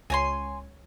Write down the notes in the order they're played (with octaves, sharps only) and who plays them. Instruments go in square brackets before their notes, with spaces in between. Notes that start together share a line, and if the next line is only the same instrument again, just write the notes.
[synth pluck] C#2 C#5 [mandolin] G#5 A#5 C6